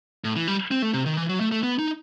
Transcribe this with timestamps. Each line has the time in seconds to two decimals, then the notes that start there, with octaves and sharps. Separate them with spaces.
0.24 A2
0.36 E3
0.48 G3
0.71 C4
0.82 A3
0.93 C3
1.06 D#3
1.17 E3
1.29 F#3
1.40 A3
1.52 A3
1.63 B3
1.79 D#4